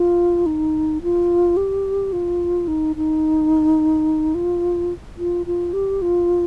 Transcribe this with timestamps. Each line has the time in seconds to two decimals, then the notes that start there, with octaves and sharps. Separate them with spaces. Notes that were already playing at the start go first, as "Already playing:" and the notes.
Already playing: F4
0.46 D#4
1.03 F4
1.57 G4
2.13 F4
2.68 D#4
2.96 D#4
4.35 F4
5.18 F4
5.46 F4
5.73 G4
6.02 F4